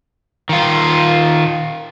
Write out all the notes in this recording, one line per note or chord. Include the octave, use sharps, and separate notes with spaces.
D#3 F4